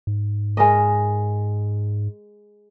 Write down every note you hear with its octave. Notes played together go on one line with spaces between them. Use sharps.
G#2
G#3 A#4 D#5